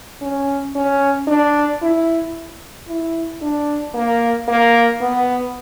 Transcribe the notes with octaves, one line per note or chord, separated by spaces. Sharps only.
C#4
C#4
D4
E4
E4
D4
A#3
A#3
B3